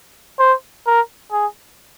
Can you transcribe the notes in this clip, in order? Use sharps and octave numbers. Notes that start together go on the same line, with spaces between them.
C5
A#4
G#4